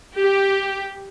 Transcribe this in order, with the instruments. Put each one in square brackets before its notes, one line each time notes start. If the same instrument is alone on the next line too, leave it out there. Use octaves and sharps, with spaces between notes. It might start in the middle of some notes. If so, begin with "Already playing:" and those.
[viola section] G4